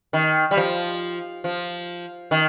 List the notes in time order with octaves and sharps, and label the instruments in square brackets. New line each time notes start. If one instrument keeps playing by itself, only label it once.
[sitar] D#3
G3
F3
F3
D#3